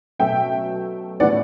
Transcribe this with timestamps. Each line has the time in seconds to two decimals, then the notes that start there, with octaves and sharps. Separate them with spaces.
0.19 B2 F#3 A3 C#4 E5 G5
1.20 A2 E3 B3 D5 F#5